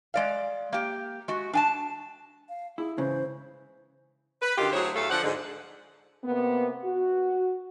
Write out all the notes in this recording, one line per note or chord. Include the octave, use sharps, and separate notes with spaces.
G#3 D5 F5
A#3 G4
G#3 F#4
D4 G#5 A5
F5
E4 G#4
G#2 C#3 E3 C5
B4
F#2 D3 D#3 F4 G4
D2 F#3 E4 G#4 C5 C#5
E2 F#3 A3 A4 F5
D3 F3 C5 D5 F#5
G#2 D3
C3 A#3 B3
F#4